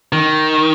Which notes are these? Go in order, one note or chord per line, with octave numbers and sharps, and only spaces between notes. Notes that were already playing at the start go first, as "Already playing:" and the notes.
D#3